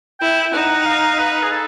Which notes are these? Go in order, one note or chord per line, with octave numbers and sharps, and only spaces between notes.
E4 G5
G5
D#4 F#5
F5
B4
G#4
A4